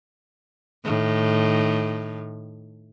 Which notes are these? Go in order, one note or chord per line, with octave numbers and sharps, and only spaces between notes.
A2 D#3